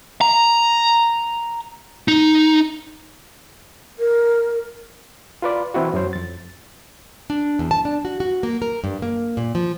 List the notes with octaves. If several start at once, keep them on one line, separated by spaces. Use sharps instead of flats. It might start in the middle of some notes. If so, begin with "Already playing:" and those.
A#5
D#4
A#4
F4 B4 D5
E3 C4 E4 F#4
F#2 F#3 C5
F2 A6
D4
E2
A5
D4
F#4
F#4
A#3
A#4
G2
A#3
A#2
F3